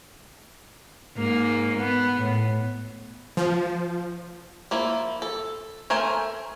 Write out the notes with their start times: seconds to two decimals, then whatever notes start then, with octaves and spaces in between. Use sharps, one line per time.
1.17 G#2 A#3
1.78 B3
2.17 A2
3.37 F3
4.71 F3 A#3 E4
5.22 A4
5.90 A3 A#4 C5 G#5